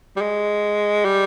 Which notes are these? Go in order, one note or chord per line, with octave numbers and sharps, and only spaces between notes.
G3
G#3
G3